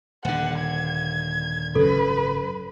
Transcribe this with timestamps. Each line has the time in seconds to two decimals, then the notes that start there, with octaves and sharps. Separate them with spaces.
0.25 D#1 D3 F#5
0.59 G#6
1.75 G#1 F#2 C#3 A4 B4